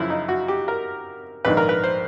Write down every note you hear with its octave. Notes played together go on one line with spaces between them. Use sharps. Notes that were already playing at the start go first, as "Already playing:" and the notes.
Already playing: F#2 C#3 F3 E4
D#4
F#4
G4
A#4
A#1 G#2 D#3 B4
A#4
B4
C5